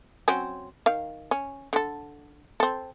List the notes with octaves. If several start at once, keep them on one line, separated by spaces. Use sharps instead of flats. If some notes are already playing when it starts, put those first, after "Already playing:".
F#3 C4 C#4
D#3 F5
C#4
D3 A4
C4 A4